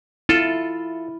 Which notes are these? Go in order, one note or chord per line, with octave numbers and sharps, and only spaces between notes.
E4 F4 A4